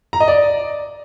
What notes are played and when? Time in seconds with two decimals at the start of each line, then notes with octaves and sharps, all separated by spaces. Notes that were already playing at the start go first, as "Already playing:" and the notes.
0.13 A#5
0.20 D#5
0.28 D5